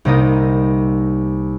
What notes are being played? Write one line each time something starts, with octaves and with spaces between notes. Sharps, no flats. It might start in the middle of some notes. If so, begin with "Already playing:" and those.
C2 C3 A#3 D#4 D#5